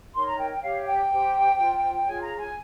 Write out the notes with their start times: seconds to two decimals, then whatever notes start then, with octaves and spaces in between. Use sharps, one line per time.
0.14 D#4 A#4 C#5 C6
0.26 A#5
0.37 G5
0.50 G5
0.62 G4 C#5 F5
0.81 F5
0.85 G5
1.10 G4 C5
1.58 F4 C5
2.05 F4 G#4 C#5 G#5
2.21 A#5
2.37 G#5